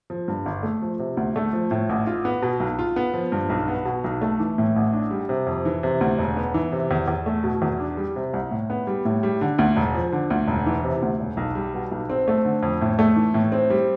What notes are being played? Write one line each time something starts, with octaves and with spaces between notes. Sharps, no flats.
F3
G2
G1
A3
F3
C3
D2
A3
F3
A2
A1
F4
B3
B2
B1
F4
B3
F3
G2
B1
B3
B2
B1
A3
E3
A2
A1
D4
G3
C3
F2
E3
C3
D2
E1
B3
E3
C3
E2
E2
A3
B2
E2
D4
G3
C3
C2
A2
B3
G3
A2
G3
D3
D2
E1
F3
D3
D2
E1
E3
C3
D2
E1
B1
G3
B2
B1
C4
A3
D3
F2
A2
A3
E3
A2
C4
G3